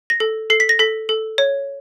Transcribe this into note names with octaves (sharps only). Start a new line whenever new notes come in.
A#6
A4
A4 C7
B6
A#6
A4 B6
A4
C#5